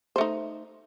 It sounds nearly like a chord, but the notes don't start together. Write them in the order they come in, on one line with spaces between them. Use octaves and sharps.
C5 A3 D#4